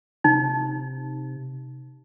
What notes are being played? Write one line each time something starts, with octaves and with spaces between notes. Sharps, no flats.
C3 D#4